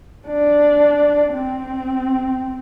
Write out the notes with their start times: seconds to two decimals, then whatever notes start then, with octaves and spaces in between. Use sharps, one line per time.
0.27 D4
1.34 C4